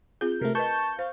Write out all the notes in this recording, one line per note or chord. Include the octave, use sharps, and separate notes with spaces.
C4 F4 G#4 G6
C3 A3 A#4
A#4 B4 D#5 A5 C#6 G6
C5 F5